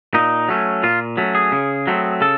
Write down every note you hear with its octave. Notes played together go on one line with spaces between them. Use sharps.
A#2 D#4
F#3 A3 C#4
A#2 F4
F#3 A3 C#4
G#4
C#3
F#3 A3 C4
C#3 A4